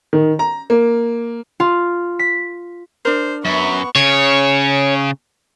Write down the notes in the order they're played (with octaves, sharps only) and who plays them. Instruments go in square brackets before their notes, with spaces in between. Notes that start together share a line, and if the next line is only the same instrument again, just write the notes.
[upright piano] D#3
A#5
A#3
[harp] F4
B6
[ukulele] D4 A#4 [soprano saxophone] C5
[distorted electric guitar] F#2 [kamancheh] B3 C#6 [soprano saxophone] E5
[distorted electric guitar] C#3 [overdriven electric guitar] C#5